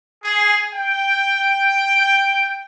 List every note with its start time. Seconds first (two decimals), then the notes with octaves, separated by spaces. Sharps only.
0.24 G#4
0.72 G5